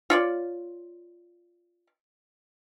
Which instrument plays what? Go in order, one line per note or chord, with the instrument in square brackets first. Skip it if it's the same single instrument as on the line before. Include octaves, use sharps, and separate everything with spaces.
[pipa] F4 C#5 D5